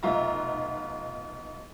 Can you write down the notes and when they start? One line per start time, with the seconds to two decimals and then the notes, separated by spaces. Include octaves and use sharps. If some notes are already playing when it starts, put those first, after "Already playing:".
0.03 F1 B1 F#3 F4 E5 A#5